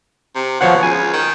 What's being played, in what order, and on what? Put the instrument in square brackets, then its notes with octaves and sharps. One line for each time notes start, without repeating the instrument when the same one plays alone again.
[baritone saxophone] C3
[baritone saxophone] B2 [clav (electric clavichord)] F3 C#5 F#5
[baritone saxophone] C#2 [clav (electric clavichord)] G#5
[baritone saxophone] D#3